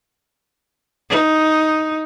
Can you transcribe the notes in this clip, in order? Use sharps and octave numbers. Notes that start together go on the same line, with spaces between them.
D#4